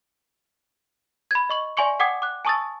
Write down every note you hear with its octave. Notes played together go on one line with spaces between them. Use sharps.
B5 G#6
D#5 C#6 F#7
D5 E5 G#5 C6 C#6 C#7
F#5 G5 D6 D#6 G#6 C#7
D6 F#6
G#5 A5 C#6 D#6 E6 A6